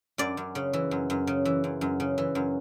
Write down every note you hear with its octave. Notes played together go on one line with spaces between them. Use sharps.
F#2 D5
F#2
C#3
E3
F#2
F#2
C#3
E3
F#2
F#2
C#3
E3
F#2